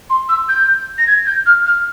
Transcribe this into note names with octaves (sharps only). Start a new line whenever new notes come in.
C6
E6
G6
A#6
G#6
G6
F6
F6